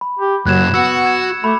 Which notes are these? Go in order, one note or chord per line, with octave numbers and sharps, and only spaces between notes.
B5
G4
F#2 F#3 A#3 F#6 G#6 E7
B3 F#4 E6 C#7
E6 G#6 E7
A3 B5 D6